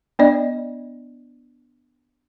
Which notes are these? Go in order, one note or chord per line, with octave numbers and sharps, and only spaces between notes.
B3 D4 D5 D#5